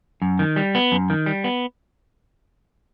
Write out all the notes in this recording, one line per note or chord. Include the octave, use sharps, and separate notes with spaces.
F#2
D#3
G3
B3
F#2
D#3
G3
B3